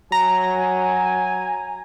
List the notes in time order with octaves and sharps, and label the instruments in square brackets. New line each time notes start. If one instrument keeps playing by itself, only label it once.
[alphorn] F#3 [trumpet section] G#5 [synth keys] A#5